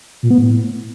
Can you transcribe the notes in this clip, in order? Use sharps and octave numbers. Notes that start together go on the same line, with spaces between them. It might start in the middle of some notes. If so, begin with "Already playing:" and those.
A#2
B3
A2